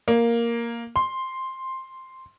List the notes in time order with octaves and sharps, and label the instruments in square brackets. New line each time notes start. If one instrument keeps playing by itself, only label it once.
[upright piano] A#3
C6